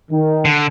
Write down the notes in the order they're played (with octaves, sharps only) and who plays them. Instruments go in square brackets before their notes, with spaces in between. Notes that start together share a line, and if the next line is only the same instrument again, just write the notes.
[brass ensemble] D#3
[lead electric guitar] D3